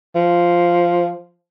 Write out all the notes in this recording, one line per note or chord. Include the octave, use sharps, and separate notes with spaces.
F3